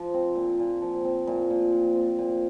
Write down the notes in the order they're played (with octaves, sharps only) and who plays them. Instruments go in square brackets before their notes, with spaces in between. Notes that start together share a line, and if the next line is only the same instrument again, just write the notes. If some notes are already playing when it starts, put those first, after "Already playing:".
Already playing: [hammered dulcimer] F3
C4
A#2
A#2
F3
C4
A#2
A#2
F3
C4
A#2